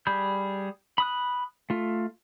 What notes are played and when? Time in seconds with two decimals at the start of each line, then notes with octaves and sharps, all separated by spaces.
0.07 G3 G#4 B5 G6
0.98 B5 D#6 F#6
1.70 A3 F4